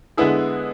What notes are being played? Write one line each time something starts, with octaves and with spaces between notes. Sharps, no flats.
D3 G#3 B3 E4 G#4